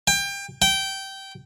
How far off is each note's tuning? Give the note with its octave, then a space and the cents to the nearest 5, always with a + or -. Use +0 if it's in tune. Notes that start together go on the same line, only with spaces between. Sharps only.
G5 +25
G5 -15